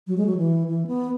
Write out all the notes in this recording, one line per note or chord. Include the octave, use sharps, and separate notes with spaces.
F#3
G#3
F#3
E3
E3
B3